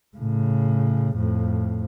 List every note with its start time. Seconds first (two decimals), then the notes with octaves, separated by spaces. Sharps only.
0.17 A2 C#3
1.16 F2 A2